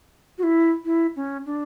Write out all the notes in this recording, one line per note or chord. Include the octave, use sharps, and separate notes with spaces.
F#4
E4
E4
C#4
D4